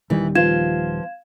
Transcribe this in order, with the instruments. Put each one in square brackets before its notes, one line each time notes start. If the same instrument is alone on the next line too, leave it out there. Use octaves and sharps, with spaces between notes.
[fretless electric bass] D#1 D#3 G3 [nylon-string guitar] E3
[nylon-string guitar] F3 B3 F4 [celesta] F5 G#6 E7